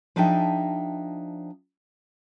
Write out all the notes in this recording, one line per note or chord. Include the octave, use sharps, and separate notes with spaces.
F3 D4 D#4 G#4 E5 G5